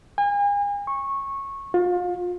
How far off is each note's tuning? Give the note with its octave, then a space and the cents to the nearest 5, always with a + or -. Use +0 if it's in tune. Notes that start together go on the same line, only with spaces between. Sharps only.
G#5 -40
C#6 -15
F4 +30